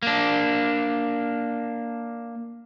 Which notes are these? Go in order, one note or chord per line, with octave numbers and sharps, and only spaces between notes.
A#3 D4